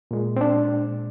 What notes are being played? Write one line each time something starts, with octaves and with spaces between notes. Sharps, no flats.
A#2 G#3
C4
D4